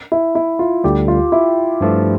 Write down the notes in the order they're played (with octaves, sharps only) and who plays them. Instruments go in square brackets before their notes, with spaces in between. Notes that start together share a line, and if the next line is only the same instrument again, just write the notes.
[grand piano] E4
E4
F4
[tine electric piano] D2 D3 G3 [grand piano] G4
[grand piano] F4
E4
[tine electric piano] G2 F3 A3